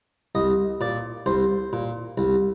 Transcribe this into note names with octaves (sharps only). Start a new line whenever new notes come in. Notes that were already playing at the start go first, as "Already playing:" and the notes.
C2 D#5
A#2 D5
C2 C5
A#2
C2